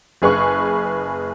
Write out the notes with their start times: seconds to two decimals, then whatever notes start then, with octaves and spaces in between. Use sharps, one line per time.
0.22 F#1 G#4 B4 C#6